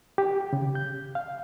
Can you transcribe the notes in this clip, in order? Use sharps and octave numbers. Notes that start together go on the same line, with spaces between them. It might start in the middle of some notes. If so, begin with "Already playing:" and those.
G4
C#3
G6
F5